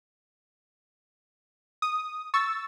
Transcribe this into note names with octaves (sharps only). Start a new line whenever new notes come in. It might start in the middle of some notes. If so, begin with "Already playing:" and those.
D#6
C#6 E6 A6